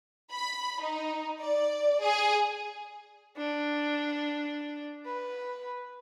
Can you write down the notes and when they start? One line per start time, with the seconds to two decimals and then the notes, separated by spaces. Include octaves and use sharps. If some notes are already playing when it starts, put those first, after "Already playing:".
0.32 B5
0.82 D#4
1.41 D5
2.02 G#4
3.37 D4
5.06 B4